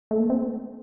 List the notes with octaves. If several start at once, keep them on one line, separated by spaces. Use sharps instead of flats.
A3
A#3
C4